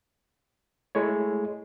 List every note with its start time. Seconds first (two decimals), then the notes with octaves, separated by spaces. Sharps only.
0.95 G#3 A3 E4 C#5